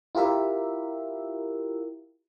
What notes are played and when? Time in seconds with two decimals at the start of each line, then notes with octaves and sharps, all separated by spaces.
0.15 E4 F4 G4 A#4 E5